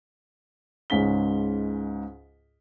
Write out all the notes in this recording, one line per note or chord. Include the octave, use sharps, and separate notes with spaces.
C#2 G#2 C#4 B6 G7